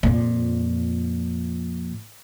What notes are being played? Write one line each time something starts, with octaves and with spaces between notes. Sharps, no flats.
F2 A#2